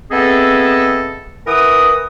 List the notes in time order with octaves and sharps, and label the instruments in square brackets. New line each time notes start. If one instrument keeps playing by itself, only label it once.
[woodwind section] B3 C4 G#4 A4 D#5 E5
E3 A#4 F#5 D#6